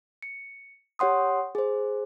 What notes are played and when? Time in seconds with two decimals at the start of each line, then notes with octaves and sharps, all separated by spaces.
0.22 C#7
0.99 G4 C#5 F#5 C6 D#6
1.55 G#4 C5